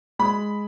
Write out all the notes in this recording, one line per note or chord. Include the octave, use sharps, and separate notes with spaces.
G#3 B5